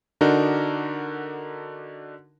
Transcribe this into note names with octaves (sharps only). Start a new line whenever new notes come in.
D3 D4 D#4 F#4 A#4